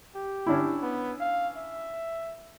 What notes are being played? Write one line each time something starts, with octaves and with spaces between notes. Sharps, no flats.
G4
C#4 D4 E4
B3
F5
E5